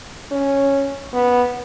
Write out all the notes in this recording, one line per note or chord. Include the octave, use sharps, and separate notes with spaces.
C#4
B3